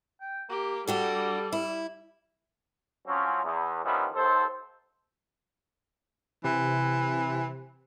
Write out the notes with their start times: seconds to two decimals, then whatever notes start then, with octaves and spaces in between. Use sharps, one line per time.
0.20 G5
0.49 A#3 G4
0.88 G3 D4 F#4 G4 A4
1.53 E4
3.06 F3 F#3 C4 C#4
3.44 E2
3.84 D#3 F3 G3 B3 C#4 E4
4.15 D#2 A4 C5
6.44 C3 E3